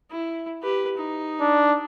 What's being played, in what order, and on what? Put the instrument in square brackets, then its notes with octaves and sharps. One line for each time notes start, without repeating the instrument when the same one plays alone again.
[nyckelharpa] E4
G4 B4
D#4
[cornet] D4